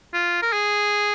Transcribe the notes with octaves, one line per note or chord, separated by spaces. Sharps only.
F4
A#4
G#4